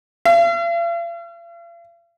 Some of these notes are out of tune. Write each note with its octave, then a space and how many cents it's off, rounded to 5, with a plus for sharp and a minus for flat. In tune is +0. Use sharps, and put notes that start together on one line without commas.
F5 -45